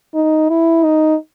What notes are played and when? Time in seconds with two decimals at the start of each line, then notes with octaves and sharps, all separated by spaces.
0.15 D#4
0.49 E4
0.84 D#4